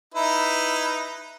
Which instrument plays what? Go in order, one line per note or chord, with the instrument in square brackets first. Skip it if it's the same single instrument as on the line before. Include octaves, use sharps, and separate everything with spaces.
[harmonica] D#4 E4 B4